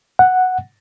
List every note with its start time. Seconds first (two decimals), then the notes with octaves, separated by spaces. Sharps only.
0.19 F#5